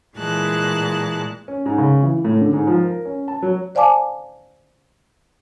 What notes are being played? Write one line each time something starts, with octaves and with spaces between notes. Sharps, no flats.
A#2 E3 G#3 A5 F#6
C#4
G#2
C#3
E3
A2
D3
G#2
F3
A#4
C#4
A5
F#3
C5 D5 F5 G#5 A5 D6